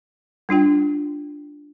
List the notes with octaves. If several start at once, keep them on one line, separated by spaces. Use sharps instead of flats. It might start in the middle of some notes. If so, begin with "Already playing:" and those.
G3 D4 F4 G5